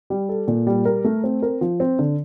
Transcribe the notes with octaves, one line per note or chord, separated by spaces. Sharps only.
G3
A4
A#2
G3
A#4
A3
C4
A#4
F3
C4
D3